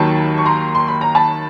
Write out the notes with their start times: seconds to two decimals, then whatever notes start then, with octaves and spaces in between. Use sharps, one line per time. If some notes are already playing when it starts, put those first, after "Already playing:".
Already playing: D#2 D#3 F#3 A5 B5
0.38 C#6
0.45 A#5 C6
0.75 C6
0.88 B5
1.01 A#5
1.15 A5 B5